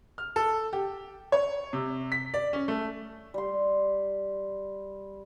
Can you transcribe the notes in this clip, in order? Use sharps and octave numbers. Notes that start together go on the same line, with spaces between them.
F6
A4
G4
C#5
C3
B6
D5
C#4
A3
G3 C6